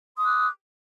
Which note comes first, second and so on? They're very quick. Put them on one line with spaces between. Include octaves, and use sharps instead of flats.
C6 D#6 D6 F#6